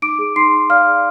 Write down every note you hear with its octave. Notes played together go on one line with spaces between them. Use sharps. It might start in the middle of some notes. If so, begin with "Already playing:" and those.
D#4 D6 D7
G#4
D#4 C6 C7
D#4
D5 F5 F6
G#4